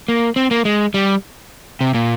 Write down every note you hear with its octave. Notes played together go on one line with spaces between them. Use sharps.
A#3
C4
A#3
G#3
G3
C3
A#2